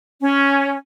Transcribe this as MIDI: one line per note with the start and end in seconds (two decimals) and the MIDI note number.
0.20 0.76 61